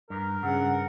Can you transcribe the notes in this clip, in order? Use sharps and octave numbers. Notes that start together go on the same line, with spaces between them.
G2 A#4
G2 C#3 F#5